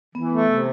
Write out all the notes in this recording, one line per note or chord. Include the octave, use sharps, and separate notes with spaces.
E3 B3
A3
C3